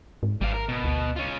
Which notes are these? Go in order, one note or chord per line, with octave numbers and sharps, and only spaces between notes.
G#2
G#1 G3 F5
A#4
B2
D2
C#4 F4